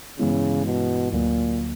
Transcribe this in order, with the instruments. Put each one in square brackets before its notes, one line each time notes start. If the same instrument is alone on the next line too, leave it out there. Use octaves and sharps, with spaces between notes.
[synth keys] G2 E3 G#3 B3 E4 [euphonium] C#3
[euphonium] B2
[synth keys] D2 D3 F#3 A#3 [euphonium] A#2